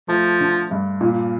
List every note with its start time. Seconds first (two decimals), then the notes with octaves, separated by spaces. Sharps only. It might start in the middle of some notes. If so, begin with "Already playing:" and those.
0.08 F3 A3
0.40 D3
0.71 G2
1.01 A#2